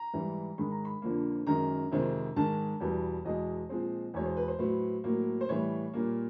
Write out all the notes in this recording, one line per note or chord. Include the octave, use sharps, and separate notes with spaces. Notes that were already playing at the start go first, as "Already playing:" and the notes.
Already playing: A#5
G#2 E3 G3
G#2 D#3 G#3 B5
A#5
B5
F2 D3 F3 A#3
F#2 D#3 G#3 A#5
F2 C3 D#3 G#3 C4
G#2 D#3 G#3 A5
E2 B2 G3 B3
E2 B2 G#3 D#5
A#2 F3 G#3 C4
E2 B2 G#3 C#5
C5
B4
C5
A2 F#3 B3
A2 F#3 A#3
C5
A2 E3 G3 B3 C#5
A#2 G3 A#3